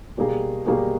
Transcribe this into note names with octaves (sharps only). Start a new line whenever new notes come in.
B2 G3 A#3 D#4 G#4
B2 G3 A#3 D#4 G#4